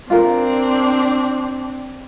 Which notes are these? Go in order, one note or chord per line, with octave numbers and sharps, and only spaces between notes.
C4 D4 F4 A#4